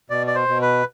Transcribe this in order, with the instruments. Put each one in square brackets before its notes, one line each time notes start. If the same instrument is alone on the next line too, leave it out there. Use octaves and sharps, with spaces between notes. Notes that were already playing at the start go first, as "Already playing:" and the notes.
[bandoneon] B2 D5
D5
C5
B2
B4